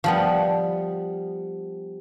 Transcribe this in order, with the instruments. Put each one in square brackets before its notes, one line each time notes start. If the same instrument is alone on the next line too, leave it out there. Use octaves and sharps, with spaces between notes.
[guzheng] F3 G3 B3